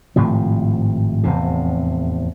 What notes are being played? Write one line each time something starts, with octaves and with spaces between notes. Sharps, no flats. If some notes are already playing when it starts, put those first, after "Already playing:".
G#1 A2 C3 F3
F1 E2 A2 C3